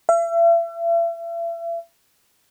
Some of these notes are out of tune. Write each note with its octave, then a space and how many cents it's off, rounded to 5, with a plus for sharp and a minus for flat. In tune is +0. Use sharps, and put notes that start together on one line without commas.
E5 +40